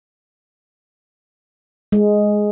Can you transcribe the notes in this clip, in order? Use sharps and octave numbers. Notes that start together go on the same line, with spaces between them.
G#3